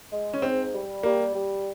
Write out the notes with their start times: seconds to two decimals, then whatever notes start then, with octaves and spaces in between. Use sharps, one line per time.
0.12 G#3
0.34 C#4
0.42 G#2 C4
0.73 G3
1.03 G3 A#3
1.34 G3